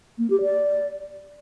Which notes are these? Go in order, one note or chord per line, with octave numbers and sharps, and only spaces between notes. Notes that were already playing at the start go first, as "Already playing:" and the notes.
A#3
G4
D5